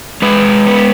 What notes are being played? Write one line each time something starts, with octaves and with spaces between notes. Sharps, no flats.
G#3 B4
B3